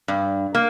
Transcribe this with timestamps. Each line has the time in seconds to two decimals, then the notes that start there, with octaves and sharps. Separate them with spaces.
0.08 G2
0.55 A#3